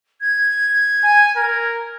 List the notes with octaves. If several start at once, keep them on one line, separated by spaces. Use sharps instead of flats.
G#6
G#5
A#4